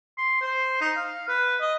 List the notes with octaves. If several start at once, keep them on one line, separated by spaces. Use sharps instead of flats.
C6
C5
D#4
F5
B4
D#5